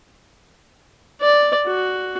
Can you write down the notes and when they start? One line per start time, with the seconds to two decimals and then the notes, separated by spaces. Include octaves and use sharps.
1.21 D5
1.67 F#4